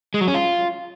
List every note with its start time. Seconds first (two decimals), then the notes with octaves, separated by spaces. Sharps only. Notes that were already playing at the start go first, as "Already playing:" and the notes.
0.14 G#3
0.21 F#3
0.28 C#4
0.34 F4